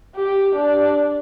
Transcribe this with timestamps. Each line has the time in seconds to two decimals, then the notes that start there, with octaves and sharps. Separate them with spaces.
0.15 G4
0.55 D4